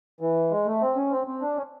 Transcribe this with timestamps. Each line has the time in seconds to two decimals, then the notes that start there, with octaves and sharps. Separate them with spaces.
0.21 E3
0.51 G#3
0.66 A3
0.81 C4
0.96 C#4
1.12 C4
1.27 C4
1.42 D4
1.57 C#4